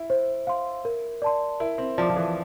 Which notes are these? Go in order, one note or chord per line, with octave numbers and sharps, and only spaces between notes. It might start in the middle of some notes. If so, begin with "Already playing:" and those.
Already playing: E4
C5
F5 C6
A#4
D5 A5 C6
E4 A#4
C4
F3 D5 A5 D6
F3
E3